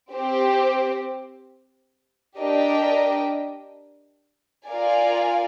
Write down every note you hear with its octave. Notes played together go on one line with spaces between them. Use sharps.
C4 G4 C5
D4 G4 A#4 D#5 G5
F4 A#4 D5 F5 G#5